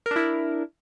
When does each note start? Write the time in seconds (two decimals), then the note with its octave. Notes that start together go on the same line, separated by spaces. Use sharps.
0.06 A#4
0.11 D4
0.16 E4